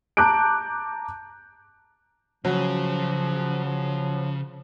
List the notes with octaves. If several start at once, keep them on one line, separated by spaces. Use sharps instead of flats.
A5 A#5 D6 F#6 G6 D7
C#3 F3 F#3
F3